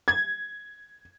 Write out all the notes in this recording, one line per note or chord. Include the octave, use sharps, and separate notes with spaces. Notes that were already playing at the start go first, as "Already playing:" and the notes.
G#6